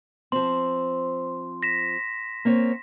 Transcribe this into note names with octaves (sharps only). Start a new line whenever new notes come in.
F3 C4 C6
A#6 B6 E7
A#3 C4 C#5